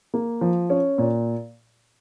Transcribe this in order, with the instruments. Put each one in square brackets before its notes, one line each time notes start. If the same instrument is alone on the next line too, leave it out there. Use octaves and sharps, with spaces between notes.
[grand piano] A#3
F3
C#4
A#2